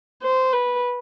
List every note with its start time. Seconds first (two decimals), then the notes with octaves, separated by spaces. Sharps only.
0.23 C5
0.53 B4